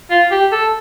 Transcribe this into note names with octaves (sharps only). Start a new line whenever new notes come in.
F4
G4
A4